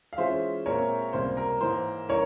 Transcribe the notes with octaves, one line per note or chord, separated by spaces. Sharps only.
F5
E3 G#3 C#4 F4 G#4 C5 E5
A#2 G#3 C4 A#4 C#5
C#2 C3 G3 A#3 C5
A#4
G#2 E3 A#3 C5
C#3 E3 G3 A#4 C#5